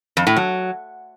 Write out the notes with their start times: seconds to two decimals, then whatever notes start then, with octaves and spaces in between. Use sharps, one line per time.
0.17 F2
0.27 A2
0.36 F#3